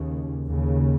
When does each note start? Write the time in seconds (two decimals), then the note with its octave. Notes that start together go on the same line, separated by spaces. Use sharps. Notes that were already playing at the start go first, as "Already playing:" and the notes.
Already playing: D#2 C#3
0.46 D#2 C#3